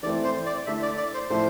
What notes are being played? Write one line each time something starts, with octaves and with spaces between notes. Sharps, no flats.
E3 A3 C4 D5
C5
D5
D3 A3 E4 E5
D5
D5
C5
A2 F3 A3 E4 C5